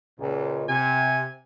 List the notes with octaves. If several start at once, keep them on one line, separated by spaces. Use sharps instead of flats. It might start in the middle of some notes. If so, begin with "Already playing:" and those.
C#2 A#2
C3 G#5